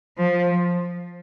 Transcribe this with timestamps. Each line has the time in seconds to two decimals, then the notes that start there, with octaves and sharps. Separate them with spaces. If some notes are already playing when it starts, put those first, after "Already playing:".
0.17 F3